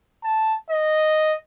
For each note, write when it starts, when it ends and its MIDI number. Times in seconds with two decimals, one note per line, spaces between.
0.23 0.54 81
0.70 1.35 75